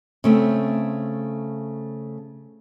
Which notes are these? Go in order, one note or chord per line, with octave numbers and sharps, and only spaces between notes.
C#3 A3 C4